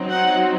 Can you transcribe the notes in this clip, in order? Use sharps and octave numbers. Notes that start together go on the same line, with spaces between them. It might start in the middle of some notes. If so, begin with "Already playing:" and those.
Already playing: F#3 C4 D#4
F#5